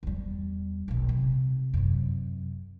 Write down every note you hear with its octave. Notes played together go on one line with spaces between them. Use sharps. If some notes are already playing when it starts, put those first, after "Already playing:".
E2 G3
D#1 B1
C3
F#2 C3